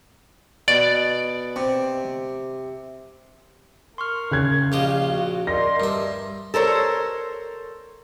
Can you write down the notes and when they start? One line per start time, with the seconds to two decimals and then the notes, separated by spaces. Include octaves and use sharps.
0.68 B2 D5
1.56 C3
3.98 A#4 C6 C#6 F6
4.31 C#3 F#6 G#6
4.72 A#1 G4 D#5 F5
5.05 F#4
5.47 A#4 D5 D#5 C6 A#6
5.80 G2 E5
6.54 A4 A#4 C5 C#5